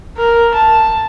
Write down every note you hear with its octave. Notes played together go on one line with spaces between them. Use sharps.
A#4
A5